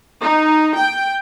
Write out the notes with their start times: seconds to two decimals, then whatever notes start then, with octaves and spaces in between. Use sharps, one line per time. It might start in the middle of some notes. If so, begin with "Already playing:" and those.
0.23 D#4
0.78 G5